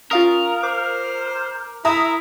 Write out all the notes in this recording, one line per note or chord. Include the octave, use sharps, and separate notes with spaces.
C#4 F4 A#4 F5 D#6
C5 D6
E4 E5 A#5 D#6